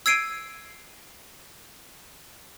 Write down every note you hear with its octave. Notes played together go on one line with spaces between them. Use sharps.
E6 G#6 C7 D7 D#7